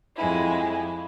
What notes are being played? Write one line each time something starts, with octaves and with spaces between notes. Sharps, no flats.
F2 G#3 E4